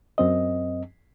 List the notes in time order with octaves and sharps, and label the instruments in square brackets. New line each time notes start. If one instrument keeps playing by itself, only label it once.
[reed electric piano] F#2 C4 D#5